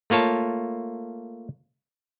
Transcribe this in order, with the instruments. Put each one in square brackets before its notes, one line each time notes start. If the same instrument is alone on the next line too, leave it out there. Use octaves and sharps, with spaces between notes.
[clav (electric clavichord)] A3 A#3 F4 C#5 A5